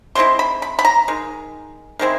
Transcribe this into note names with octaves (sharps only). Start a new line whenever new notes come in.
D#3 G#3 C4 E4 C6
B5
B5
B5
A#5
D#3 G#3
D#3 G#3 C4 E4